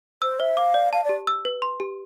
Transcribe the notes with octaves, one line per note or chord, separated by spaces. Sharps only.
C5 E6
C5 E5
F5 D6
D5
F5 A5
D5
G4
E6
B4
C6
G4